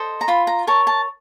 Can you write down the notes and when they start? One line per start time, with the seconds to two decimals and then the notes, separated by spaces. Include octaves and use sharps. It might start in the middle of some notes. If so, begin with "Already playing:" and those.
Already playing: A4 C5 D#5
0.21 A#5
0.28 F4 B5
0.47 A#5
0.67 A#4 C#5 A5
0.87 A5